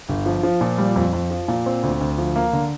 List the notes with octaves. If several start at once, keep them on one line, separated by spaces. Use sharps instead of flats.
G1
F3
F3
A#2
G3
F2
F2
F3
A#2
C4
D2
D2
F3
A#3
D3